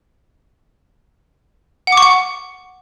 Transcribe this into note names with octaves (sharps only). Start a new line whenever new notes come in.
F#5
D6
C#6
F#5